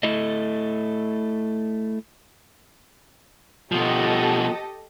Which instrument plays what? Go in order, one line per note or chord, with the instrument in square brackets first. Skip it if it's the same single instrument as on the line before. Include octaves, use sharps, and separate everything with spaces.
[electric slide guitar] A3 E4 A4 D#5
[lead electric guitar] B2 F3 [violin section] G4 A4 D#5